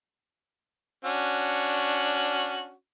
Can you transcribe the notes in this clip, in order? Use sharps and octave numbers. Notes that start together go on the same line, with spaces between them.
C#4 D4 F#4